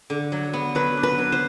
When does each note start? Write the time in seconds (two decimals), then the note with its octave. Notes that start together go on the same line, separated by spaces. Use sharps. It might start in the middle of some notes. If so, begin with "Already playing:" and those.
0.10 D3
0.32 F#3
0.53 B3
0.75 F#3 B4
0.97 D4
1.03 B4
1.18 F#3
1.32 C5